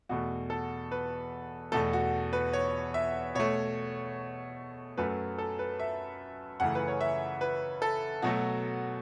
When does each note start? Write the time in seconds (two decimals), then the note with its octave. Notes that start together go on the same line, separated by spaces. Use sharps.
0.09 E2 B2 A3 F#4
0.50 A4
0.91 B4
1.72 E2 B2 A3 A4
1.93 F#4
2.33 B4
2.53 C#5
2.94 E5
3.35 B2 A3 C#5
4.97 F#2 F#3 A3 B4
5.38 A4
5.59 B4
5.79 E5
6.60 F#2 C#3 E3 A3 F#5
6.75 B4
6.88 C#5
7.01 E5
7.41 B4
7.82 A4
8.22 B2 F#3 A3 F#4